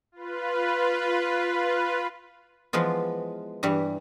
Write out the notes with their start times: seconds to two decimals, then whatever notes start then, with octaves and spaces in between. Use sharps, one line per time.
0.12 F4 B4
2.73 E3 F3 G#3 B3 F4
3.63 G2 E3 G3